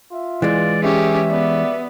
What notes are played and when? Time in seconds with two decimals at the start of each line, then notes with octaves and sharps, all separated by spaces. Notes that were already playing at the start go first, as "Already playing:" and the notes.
0.12 F4 E5
0.42 E3 G#3 D5
0.83 C#4 G4 G#4 E5
1.31 B3 D5